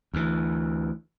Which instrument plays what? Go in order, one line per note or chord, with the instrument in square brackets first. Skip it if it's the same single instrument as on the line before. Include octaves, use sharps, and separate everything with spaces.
[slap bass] D2 E3